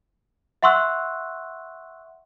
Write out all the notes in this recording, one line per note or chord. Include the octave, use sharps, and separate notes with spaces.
E5 F#5 C6 C#6 E6 F#6